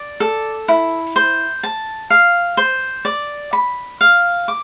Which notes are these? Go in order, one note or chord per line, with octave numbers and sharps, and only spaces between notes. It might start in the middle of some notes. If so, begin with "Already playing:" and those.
Already playing: D5
A4
E4
C5
A5
F5
C5
D5
B5
F5
D6